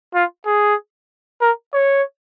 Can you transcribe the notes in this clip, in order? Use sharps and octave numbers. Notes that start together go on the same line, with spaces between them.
F4
G#4
A#4
C#5